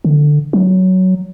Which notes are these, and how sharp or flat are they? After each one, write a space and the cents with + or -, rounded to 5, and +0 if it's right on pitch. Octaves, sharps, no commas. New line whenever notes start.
D3 +10
F#3 +10